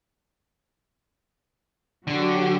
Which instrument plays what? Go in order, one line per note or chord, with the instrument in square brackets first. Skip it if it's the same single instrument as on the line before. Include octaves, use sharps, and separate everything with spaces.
[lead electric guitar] D3 [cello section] F#3 F#4 G4